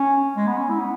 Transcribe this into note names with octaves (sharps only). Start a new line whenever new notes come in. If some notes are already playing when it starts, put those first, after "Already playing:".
Already playing: C#4
G#3
B3
C#4
E4
B3